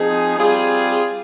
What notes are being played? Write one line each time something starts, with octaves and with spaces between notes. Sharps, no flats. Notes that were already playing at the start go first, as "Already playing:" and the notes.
Already playing: F3 C4 D#4 G#4
G3 C4 F4 G#4